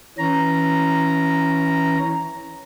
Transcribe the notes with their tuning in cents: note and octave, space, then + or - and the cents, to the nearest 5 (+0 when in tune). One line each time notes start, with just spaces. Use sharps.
E3 -10 C#4 +0 A#5 +0